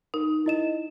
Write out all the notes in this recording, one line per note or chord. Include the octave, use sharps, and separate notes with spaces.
D#4 A#4
E4 D#5 E7